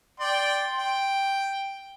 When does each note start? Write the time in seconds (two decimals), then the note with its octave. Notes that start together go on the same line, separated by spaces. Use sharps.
0.20 D5 G5 C6
0.76 G5